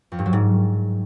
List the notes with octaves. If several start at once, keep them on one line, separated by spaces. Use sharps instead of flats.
F2
G2
F#3
G#2